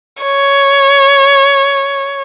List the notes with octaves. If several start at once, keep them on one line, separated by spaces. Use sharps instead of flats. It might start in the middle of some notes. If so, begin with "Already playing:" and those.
C#5